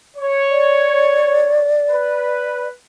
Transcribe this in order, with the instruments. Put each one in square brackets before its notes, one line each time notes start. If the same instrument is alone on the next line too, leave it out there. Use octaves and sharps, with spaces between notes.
[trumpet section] C#5
[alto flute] D5
[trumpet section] B4